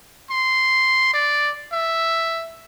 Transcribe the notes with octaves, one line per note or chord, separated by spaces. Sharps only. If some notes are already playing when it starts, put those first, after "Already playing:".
C6
D5
E5